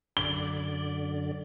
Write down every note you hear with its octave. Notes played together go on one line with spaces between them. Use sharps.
F#2 D3 D5 G7